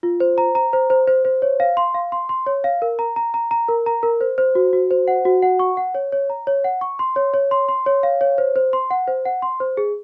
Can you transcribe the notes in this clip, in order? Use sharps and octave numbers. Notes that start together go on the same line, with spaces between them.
F4
C5
A#5
A#5
C5
C5
C5
C5
C#5
F5
C6
F5
C6
C6
C#5
F5
A#4
A#5
A#5
A#5
A#5
A#4
A#5
A#4
C5
C5
F#4
F#4
C5
F#5
F#4
F#5
C#6
F#5
C#5
C#5
A#5
C#5
F#5
C#6
C6
C#5
C#5
C6
C6
C#5
F5
C#5
C5
C5
C6
F#5
C5
F#5
C6
C5
G#4